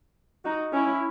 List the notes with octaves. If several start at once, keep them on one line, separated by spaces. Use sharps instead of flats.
D#4 F#4
C#4 E4